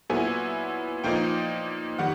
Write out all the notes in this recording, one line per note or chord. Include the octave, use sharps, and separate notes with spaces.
A#2 F#3 B3 E4 G#5
A#2 F3 A#3 D#4 G5
D#3 G3 F#5